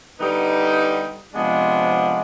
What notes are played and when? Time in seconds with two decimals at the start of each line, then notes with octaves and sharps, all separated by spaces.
0.20 D3 G3 B3 D#4
1.34 C3 F3 G#3 B3 D4